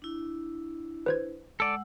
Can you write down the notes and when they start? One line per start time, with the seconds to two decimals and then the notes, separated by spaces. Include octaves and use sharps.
0.02 D4 E4
1.06 B4 C5 G#6
1.60 G#3 A4 D5 F#5 E6